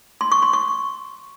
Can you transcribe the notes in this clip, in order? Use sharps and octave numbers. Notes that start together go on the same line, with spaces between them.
C6
C#6
C6
C#6